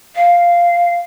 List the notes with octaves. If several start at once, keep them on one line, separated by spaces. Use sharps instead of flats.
F5